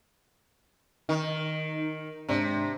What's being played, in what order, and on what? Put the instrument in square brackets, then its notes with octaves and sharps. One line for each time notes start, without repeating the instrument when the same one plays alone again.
[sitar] D#3 [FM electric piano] D#4
[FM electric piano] G#2 D4 A#5 [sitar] C3